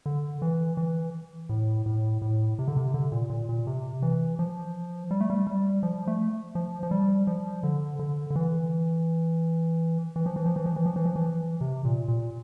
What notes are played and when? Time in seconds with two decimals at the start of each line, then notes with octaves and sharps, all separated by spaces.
0.06 D3
0.42 E3
0.77 E3
1.49 A2
1.86 A2
2.22 A2
2.59 C3
2.68 D3
2.77 C3
2.94 D3
3.12 A#2
3.30 A#2
3.49 A#2
3.67 C3
4.02 E3
4.39 F3
5.11 G3
5.20 A3
5.30 G3
5.47 G3
5.83 F3
6.07 A3
6.55 F3
6.83 F3
6.91 G3
7.27 F3
7.63 D3
7.99 D3
8.30 D3
8.36 E3
10.16 E3
10.26 F3
10.36 E3
10.46 F3
10.56 E3
10.66 F3
10.76 E3
10.86 F3
10.96 E3
11.06 F3
11.16 E3
11.61 C3
11.85 A#2
12.08 A#2